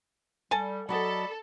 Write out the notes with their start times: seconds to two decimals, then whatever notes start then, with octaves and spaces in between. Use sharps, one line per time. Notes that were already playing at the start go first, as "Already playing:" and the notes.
0.51 G3 A4 G#5 A5
0.89 F#3 F#4 A4 D5 D#5 B5